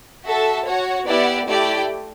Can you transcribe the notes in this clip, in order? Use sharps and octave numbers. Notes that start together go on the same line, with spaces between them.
F#4 A4 E5 A5
F#4 C#5 F#5
B3 E4 G4 D5 F#5
A3 E4 G4 D5 G5